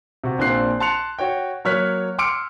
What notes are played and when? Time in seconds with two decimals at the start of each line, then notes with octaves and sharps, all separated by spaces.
0.24 C3 F#4
0.38 A#1 A#2 C4 D4 F#6 C7
0.80 A5 C6 F#6 C#7 F7
1.19 F#4 C#5 G5
1.65 F#3 A#3 C#5 F6 F#6 B6
2.19 C6 D6 E6 F6 C#7 D7